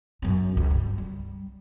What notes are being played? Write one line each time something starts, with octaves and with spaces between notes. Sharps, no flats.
F#2 C#4
C#2
G2
G3